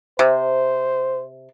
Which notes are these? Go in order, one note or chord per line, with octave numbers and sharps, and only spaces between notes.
C3 C5